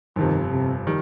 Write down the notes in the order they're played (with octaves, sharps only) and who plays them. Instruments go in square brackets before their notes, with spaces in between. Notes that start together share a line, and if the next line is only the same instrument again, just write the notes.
[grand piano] G1 F2 C3 [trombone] D#3
[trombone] C3
[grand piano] D#3 G3